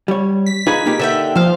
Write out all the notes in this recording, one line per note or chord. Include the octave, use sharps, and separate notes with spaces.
G3 C#5
B6
D#4 F4 G#4 B4
A#3 D#4 G4
D3 E5 G5
F3 C5 F5